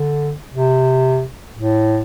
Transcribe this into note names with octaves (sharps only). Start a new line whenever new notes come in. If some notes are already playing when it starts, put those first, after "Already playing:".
Already playing: D3
C3
A2